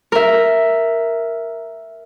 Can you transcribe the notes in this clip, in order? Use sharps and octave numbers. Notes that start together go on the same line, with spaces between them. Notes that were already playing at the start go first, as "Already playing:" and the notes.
A#4 E5